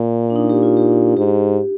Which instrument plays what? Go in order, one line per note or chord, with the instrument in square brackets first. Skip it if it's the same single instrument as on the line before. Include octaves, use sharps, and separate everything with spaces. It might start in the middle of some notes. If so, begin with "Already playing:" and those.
Already playing: [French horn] A#2
[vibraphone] D4
D#4
G4
F4
G4
[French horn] G#2 [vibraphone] G4